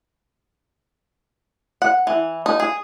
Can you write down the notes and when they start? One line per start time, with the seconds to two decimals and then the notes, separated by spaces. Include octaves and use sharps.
1.82 F#5
2.07 E3
2.46 D#4
2.60 G#4